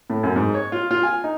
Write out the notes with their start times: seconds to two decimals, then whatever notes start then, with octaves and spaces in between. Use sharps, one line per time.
0.10 A2
0.23 F#2
0.36 G#2
0.54 C#5
0.72 F4
0.91 F4
1.03 G#5
1.24 D#4